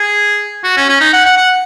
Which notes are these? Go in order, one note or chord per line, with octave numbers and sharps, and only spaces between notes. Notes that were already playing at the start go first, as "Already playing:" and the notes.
Already playing: G#4
F#4
C#4
C#4
D#4
F#5
F#5
F#5